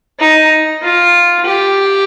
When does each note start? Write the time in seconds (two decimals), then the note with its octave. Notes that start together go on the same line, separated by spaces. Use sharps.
0.19 D#4
0.82 F4
1.46 G4